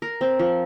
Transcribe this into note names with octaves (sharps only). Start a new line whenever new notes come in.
A#4
C4
F3